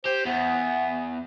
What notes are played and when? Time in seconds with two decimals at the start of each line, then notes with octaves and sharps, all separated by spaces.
0.06 G4 C5
0.26 E2 B3